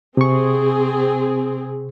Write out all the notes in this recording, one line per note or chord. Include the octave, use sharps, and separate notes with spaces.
C3 C4 G#4 C#6